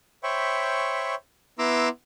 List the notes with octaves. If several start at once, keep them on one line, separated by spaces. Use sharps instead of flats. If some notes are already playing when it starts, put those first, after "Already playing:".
C5 C#5 E5 G5 B5 C#6
B3 E4 A#5 C6 D6 E6